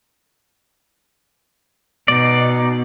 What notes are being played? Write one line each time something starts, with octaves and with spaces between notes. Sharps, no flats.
B2 D#4 D5